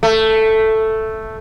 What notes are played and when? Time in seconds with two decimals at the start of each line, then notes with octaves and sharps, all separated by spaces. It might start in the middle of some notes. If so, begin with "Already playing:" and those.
0.03 A3